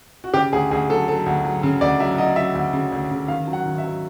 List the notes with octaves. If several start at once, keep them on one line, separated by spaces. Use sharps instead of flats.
F#4
C#3 G4
D2 G#4
D2 G#4
F#3 A4
F#3 A4
D2
F#3
C#3
D2 D5
F#3 E5
F#3 D#5
F#3 E5
D2
C#3
D2
C#3
D#3 F5
F#3
F#5
D#3
E5
F#3